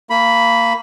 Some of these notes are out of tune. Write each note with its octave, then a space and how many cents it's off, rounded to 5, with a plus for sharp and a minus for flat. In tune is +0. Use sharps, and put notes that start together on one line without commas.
A#3 -20 B5 +0